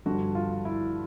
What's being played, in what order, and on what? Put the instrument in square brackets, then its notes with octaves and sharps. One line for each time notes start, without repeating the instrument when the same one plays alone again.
[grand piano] G2 D3 F3 F#4
F4
E4